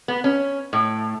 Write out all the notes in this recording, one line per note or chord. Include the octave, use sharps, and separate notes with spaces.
B3
C#4
A2